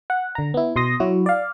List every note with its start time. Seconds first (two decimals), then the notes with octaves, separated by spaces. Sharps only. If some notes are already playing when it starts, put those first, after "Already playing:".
0.10 F#5
0.35 D3 A#5
0.54 B3 E4
0.76 B2 C6 D#6 A#6
1.00 F#3 E4 F#4
1.26 D5 F5